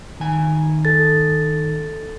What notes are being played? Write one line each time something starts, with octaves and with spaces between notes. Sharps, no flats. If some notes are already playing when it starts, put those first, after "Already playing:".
D#3 G#5
A4 A6